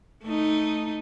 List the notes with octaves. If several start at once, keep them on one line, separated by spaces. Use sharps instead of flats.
A3 D#4